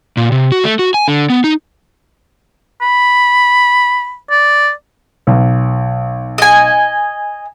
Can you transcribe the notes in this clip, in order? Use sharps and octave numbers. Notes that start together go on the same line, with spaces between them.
A#2
C3
F#4
A3
F#4
G#5
D3
B3
D#4
B5
D5
B1
D#5 G#5